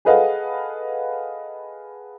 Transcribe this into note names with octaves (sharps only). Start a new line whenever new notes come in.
G#4 A4 B4 D#5 F5 F#5